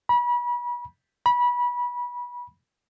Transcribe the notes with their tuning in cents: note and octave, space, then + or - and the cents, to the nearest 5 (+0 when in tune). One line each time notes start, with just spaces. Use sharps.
B5 -35
B5 -25